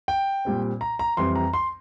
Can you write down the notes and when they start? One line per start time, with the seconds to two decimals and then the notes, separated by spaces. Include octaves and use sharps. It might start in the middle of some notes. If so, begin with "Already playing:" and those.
0.08 G5
0.45 A#2 G3 C4
0.81 A#5
0.99 A#5
1.17 F2 E3 G3 C4 C6
1.36 A#5
1.54 C6